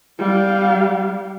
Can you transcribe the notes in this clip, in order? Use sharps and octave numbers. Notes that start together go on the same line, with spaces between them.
G3 F5